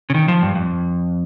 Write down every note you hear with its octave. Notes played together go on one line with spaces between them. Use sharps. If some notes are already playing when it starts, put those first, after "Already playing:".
C#3
D#3
F3
G2
F2